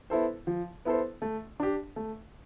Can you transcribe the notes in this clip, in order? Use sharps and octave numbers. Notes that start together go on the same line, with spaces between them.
B3 E4 A4 C5
F3
B3 E4 A4 C5
A3
D4 G4
A3